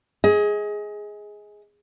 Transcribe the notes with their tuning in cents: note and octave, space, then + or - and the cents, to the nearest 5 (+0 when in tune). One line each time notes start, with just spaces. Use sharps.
G#4 +0 D#5 +30